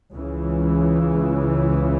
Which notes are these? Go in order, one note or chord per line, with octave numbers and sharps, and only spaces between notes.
C#2 C#3 E3